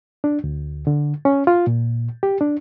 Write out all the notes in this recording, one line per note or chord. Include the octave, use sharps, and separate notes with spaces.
D4
D2
D3
C#4
F4
A#2
G4
D4